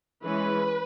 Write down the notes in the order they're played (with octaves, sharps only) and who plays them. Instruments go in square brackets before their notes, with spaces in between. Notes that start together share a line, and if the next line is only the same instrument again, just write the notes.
[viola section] E3 G#3 C#4 B4